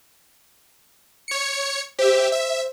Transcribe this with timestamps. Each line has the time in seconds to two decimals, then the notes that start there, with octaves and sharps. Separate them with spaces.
1.28 C#5 C#7
1.99 G4 C5 E5
2.32 E5